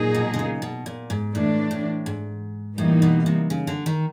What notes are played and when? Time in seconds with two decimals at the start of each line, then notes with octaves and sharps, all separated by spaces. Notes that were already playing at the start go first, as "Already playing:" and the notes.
Already playing: A#2 F#3 A#3 D#4 G#4
0.15 B2
0.34 D3
0.39 C#3
0.62 B2
0.86 A#2
1.10 G#2
1.34 A2 E3 A3 D4
1.71 A2
2.06 G#2
2.78 A2 E3 G3 A#3 D#4
3.02 B2
3.26 C3
3.50 C#3
3.67 D3
3.86 D#3